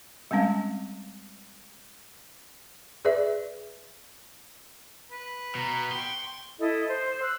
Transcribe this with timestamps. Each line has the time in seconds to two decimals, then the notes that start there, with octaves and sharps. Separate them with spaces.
0.31 G3 G#3 C4 C#4 F5
3.05 G#4 B4 D5 E5
5.11 B4
5.55 B2 A#5
5.92 G5 C6 C#6
6.59 E4 A4 D#5
6.87 C5
7.21 E6 F#6